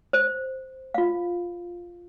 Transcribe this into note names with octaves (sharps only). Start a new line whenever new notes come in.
C5
F4 F5